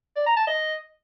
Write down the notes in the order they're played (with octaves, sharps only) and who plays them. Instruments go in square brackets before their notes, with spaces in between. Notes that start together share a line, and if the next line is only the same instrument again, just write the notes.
[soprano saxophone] D5
A#5
A5
D#5